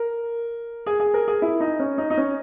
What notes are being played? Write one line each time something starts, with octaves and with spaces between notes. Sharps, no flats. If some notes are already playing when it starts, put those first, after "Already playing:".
Already playing: A#4
G#4
G#4
A#4
G#4
E4
D#4
C#4
D#4
D#4
C#4